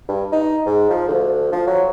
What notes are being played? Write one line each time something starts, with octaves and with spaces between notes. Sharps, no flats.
G2
D#4
G#2
F3
D2
F3
F#3